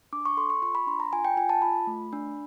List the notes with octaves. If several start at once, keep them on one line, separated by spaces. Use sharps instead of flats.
D4 D6
C#6
A4 C6
C#6
F4 C#6
B5
D4 C6
A#5
F4 G#5
G5
F4 G#5
A5
F4 B5
A3
D4